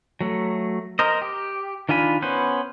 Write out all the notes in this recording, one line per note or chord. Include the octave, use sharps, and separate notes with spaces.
F#3 A3
A#4 C5 D#5
G4
D#3 D4 F4 G#5 B5
B3 C#4 B4 C5